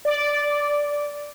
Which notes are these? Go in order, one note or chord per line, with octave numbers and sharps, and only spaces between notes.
D5